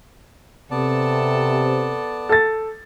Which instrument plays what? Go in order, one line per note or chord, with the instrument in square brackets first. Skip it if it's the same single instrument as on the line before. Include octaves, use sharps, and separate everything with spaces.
[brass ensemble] C3 [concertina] B3 D5 A5 [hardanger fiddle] A4
[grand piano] A4 A6